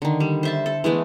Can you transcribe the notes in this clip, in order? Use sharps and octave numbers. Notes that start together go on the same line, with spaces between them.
D3 D#3
G3
C5 E5 A5
A4
E3 G#3 A3 B3